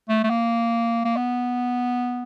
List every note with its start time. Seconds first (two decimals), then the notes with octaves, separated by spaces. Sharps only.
0.09 A3
0.24 A3
0.30 A#3
1.05 A#3
1.16 B3